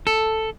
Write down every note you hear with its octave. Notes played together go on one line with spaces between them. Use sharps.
A4